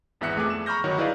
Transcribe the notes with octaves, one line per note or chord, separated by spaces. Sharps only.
G#1 E2 B3 E5 F#6 C#7
F2 A3 G#4 D6
E7
A#5 B5 C#6 F6 G6 A#6
G1 D#3 F#3 F#4 C#5
E4 G#4 B4 D5 D#5 F5